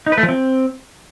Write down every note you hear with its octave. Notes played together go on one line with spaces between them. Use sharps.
D#4
B4
A3
F3
C4